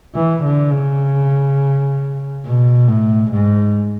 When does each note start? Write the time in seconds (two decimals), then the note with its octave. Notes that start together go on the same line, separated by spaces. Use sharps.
0.15 E3
0.44 D3
0.72 C#3
2.46 B2
2.88 A2
3.32 G#2